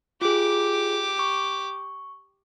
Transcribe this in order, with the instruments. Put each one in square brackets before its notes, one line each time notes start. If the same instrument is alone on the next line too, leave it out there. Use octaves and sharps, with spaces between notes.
[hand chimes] F4 G#4 [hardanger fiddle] G4 D6
[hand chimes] C#6